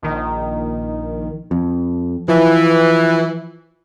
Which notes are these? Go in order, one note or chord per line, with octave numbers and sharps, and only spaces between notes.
A#1 D#3
F2
E3 F3